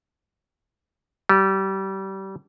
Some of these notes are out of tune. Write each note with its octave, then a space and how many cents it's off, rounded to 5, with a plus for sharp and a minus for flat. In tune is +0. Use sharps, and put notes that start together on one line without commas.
G3 -25